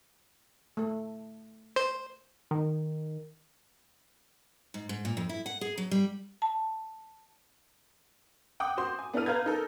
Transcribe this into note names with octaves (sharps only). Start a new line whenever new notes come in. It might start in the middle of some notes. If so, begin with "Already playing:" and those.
A3 A4
C5
D#3
G#2
G#2
A#2
F2
E4
F#5
G#4
F#3
G3
A5
F#5 G5 D6 D#6
F#4 C5 C6
G#5
B3 D4 E4 A4 F6 D#7
B4 F5 A#5 G6 G#6
D#4 A4 A#4